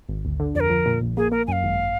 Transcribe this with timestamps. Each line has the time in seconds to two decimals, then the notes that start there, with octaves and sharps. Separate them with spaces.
0.09 G#1
0.25 D2
0.40 D3
0.55 F2 D5
0.60 A#4
0.70 F3
0.86 A#2
1.02 A#1
1.17 A#3 G#4
1.32 A#3 A#4
1.47 F#2 F5 G#5
1.63 G#1